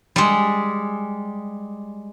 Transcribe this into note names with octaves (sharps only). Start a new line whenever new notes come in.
G3 G#3